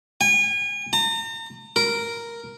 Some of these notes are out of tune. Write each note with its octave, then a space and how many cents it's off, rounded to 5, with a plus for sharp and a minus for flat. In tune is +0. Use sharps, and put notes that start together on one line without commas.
G#5 -35
A#5 -45
A#4 +0